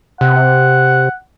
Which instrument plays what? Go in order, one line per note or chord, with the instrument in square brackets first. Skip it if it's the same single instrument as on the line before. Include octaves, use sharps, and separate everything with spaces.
[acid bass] C3 [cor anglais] F#5